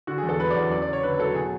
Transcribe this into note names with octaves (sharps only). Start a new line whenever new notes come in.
D3 F#4
G#4
E2
A4
F#3 B4
D5
E2
F#2 D5
D5
F#1
C#5
D3 B4
F#3 A4
B2 G#4